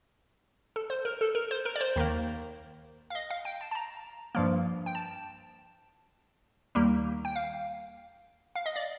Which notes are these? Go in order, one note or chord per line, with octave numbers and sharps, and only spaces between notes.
A4
C5
A#4
A4
A#4
C5
A#4
D5
C5
D#2 D#3 A#3
F5
D#5
F5
G5
A5
A5
A#5
G2 F3 A#3
G5
A5
D#2 D#3 G3 A#3
G5
F5
F5
D#5
D5